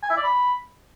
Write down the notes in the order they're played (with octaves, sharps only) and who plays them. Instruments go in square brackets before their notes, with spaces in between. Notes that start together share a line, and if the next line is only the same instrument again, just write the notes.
[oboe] G#5
E5
D5
B5